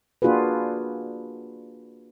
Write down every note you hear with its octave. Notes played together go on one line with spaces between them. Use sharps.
A#3 D4 F4 F#4 G#4 B4